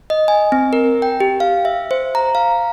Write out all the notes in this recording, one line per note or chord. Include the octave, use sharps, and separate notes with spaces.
D#5
G#5
C4
A#4
G5
G4
F5
E5
C5
A#5
F5